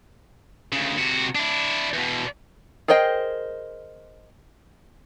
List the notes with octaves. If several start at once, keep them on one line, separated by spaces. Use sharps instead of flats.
D2 C#3
C3 F#4
D4 E4
E2 B2
G#4 A#4 C5 D#5 G5